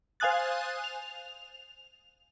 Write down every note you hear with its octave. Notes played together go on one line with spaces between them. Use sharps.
C5 F5 G#5 D#6 F#6 A6
F7